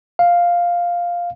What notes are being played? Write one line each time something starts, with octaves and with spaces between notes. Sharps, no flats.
F5